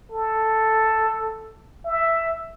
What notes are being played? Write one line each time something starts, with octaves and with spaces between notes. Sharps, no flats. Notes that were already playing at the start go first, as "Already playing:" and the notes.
A4
E5